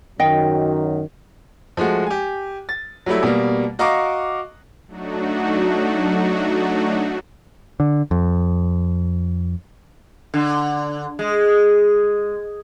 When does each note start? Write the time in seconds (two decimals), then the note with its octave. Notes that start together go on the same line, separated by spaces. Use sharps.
0.20 F#2 D#3 F#3 D#5 G5
1.77 F3 G#3 A3 F#4
2.07 G4 G#5
2.69 A6
3.06 F#3 G3 A3 E4
3.23 B2 G3 A#3
3.79 F#4 D#5 F5 A#5 C#6 D6
4.87 F#3 A3 D4 D#4 F#4
7.80 D3
8.11 F2
10.34 D3
11.19 G#3